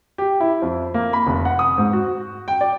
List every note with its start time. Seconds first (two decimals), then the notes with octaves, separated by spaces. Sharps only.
0.18 G4
0.40 E4
0.62 F2
0.94 A#3
1.13 B5
1.27 F1
1.45 F#5
1.59 D#6
1.78 G#2
1.93 F#4
2.48 G5
2.61 D5